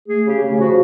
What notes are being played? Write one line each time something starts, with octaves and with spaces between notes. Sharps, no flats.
A3 G#4
C#3 G4
C#3
F3 F#4